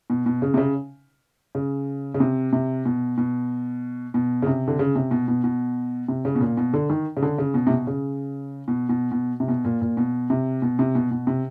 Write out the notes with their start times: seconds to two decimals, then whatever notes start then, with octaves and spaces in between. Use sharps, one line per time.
0.10 B2
0.26 B2
0.42 C#3
0.54 C3
0.58 C#3
1.55 C#3
2.14 C#3
2.20 C3
2.53 C3
2.86 B2
3.18 B2
4.14 B2
4.42 C#3
4.47 C3
4.68 D3
4.79 C#3
4.96 C3
5.11 B2
5.28 B2
5.44 B2
6.08 C3
6.25 C#3
6.35 B2
6.41 A#2
6.57 B2
6.74 D3
6.90 D#3
7.17 C#3
7.22 D3
7.38 C#3
7.54 B2
7.67 C3
7.71 B2
7.87 C#3
8.68 B2
8.89 B2
9.12 B2
9.40 C3
9.48 B2
9.65 A#2
9.82 A#2
9.97 B2
10.30 C3
10.62 B2
10.79 C3
10.95 B2
11.11 B2
11.27 C3